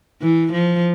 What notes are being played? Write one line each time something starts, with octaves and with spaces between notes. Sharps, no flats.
E3
F3